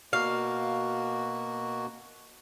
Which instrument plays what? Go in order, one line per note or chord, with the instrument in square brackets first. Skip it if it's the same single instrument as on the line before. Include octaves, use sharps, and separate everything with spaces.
[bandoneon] B2 A#3 F#4 [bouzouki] F5